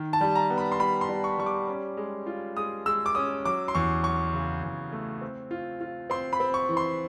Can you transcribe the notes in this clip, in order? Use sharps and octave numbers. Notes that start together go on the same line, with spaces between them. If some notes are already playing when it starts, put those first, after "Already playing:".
Already playing: D#3
A5
G3
A#5
B3
B5
C6
G3 B5
C6
G3
C#6
G3 C#6
D6
C#4
G#3
F4
G#3 D#6
G#3 E6
D6
C#4 D#6
F#3 D6
C6
E2 C#6
F#3 C#6
C#3
E2
A3
C4
F4
F4
C4 C6
B5
C4
C#6
E3
C6